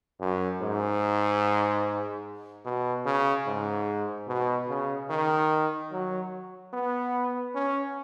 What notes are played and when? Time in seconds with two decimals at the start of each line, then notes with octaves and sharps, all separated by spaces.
0.20 F#2
0.61 G#2
2.65 B2
3.06 C#3
3.47 G#2
4.28 B2
4.69 C#3
5.10 D#3
5.91 F#3
6.73 B3
7.55 C#4